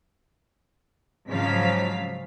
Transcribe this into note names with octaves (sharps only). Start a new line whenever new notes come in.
G#2 C#3 F3 F#3 F5 B6